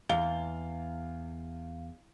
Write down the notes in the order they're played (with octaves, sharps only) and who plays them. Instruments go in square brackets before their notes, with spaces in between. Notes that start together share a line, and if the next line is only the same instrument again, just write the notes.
[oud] E2 [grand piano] F5 G7